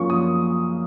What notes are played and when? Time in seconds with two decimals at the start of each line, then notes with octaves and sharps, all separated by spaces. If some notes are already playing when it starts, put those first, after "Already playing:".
Already playing: F#2 F3 A#3 C#4 F4 C#6
0.10 D#6